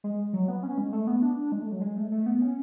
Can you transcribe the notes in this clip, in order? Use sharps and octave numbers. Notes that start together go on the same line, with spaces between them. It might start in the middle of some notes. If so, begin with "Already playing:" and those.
G#3
F#3
B3
C#4
G#3
A3
B3
D4
G#3
A3
F#3
G#3
A3
A3
B3
C#4